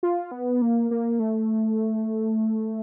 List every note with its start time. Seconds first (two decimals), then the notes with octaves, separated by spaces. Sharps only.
0.03 F4
0.31 B3
0.62 A#3
0.91 A#3
1.19 A3